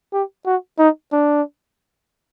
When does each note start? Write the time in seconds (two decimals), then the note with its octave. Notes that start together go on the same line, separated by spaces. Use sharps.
0.13 G4
0.46 F#4
0.79 D#4
1.12 D4